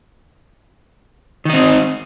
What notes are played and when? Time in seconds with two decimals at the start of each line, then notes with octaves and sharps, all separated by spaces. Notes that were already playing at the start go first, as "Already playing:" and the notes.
1.45 D#3
1.49 D#4
1.53 C4